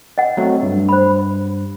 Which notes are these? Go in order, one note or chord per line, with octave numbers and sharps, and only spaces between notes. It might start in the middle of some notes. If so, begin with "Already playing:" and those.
D#5 F#5
F#3 A3 C4
G2
C5 B5